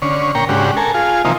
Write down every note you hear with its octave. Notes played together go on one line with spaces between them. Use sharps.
D3 C#4
A#2 C#5 G5 A#5
G#2 C#3 D4 F#4 G4
A4 A#4 G#5
F4 G#4
C3 E3 F3 A#3 D#4